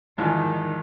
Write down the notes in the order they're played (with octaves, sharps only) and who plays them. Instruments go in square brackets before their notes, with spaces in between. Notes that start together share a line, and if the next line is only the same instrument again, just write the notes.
[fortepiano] E2 G#2 F3 [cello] D#3